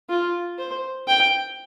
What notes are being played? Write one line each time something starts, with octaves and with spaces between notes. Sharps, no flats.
F4
C5
G5